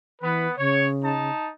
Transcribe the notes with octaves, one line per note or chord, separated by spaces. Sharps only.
E3 B3 B4
C#3 C#5
D#4 A5